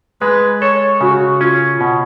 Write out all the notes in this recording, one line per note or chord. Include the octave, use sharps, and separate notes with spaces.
G#3 B4
A4 C#5
C#3 F#4
C#4 F4
B2